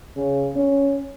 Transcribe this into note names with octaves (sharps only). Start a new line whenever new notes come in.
C#3
C#4